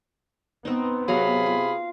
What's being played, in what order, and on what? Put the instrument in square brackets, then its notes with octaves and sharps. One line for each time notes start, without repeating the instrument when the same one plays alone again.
[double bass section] B3 [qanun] C4 D#4
[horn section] C3 G#4 B5 [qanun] F#3 A#5 [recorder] F5
[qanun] F4